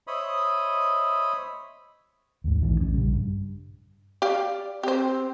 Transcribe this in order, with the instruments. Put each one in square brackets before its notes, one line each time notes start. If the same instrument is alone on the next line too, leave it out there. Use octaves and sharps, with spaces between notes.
[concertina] C5 C#5 D#5 E5 B5 D#6
[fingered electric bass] D#2 G#2
A#1 A2 D#3 E3
A#1 F2 C#4
A#1 C#3 G3
G2
[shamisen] G4 F5 [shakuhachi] D5
[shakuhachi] C4 [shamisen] G4 C5